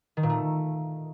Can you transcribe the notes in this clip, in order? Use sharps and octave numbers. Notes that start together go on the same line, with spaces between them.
D#3
A#2
A3